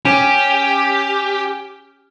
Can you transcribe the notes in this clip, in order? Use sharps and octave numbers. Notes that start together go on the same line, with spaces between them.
C#4 G4